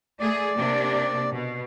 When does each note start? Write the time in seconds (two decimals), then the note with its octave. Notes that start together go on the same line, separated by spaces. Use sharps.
0.20 A3 G#4 D5
0.56 C3 A#3 D4
1.31 B2